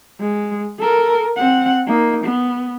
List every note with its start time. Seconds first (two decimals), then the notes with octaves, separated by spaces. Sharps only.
0.21 G#3
0.79 A4 A#4
1.37 C4 F#5
1.87 A#3 D#4
2.24 B3